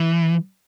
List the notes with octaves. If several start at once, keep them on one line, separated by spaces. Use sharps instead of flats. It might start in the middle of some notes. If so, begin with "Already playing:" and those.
Already playing: E3